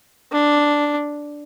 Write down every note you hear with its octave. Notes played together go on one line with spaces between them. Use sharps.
D4